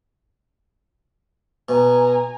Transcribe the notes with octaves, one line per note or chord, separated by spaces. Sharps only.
B2 G#5 A#5